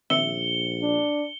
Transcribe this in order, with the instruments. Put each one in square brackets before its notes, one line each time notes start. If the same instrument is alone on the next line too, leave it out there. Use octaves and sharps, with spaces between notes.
[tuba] A#1 [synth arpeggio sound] D#3 C4 E5 [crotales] C#7 G7
[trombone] D4